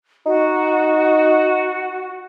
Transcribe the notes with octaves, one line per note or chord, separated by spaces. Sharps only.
D#4 F#4